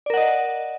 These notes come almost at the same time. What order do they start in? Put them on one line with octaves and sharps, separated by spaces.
D5 A#4 F#5 D#5